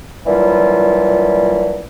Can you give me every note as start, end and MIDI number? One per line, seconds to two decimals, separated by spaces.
0.25 1.83 46
0.25 1.83 50
0.25 1.83 52
0.25 1.83 54
0.25 1.83 55
0.25 1.83 65